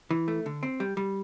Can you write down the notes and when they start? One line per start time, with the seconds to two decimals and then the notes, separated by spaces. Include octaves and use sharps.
0.11 E3
0.28 A3
0.46 D3
0.63 C4
0.80 G3
0.97 G3